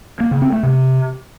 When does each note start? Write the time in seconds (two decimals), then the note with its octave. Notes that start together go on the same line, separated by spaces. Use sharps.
0.20 A#3
0.31 C#3
0.42 C4
0.52 A3
0.63 C3